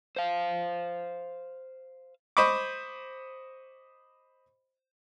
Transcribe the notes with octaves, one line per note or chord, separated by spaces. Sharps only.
C5 F5
C5 D#5 B5 C#6 D6